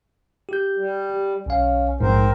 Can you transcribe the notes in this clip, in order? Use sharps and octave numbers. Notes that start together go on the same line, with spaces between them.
G4 G6
G3
B1 C#4 F5
A#1 G#2 C4 A#4 C5